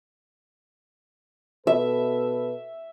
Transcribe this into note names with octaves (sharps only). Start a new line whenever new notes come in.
B2 A4 B4 E5